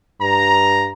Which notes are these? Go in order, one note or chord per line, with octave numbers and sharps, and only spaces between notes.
G2 A#5